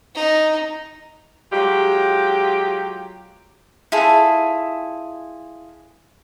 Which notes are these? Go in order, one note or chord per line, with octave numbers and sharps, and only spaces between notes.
D#4
F#3 G#3 F4 G4
E4 F4 G#4 A4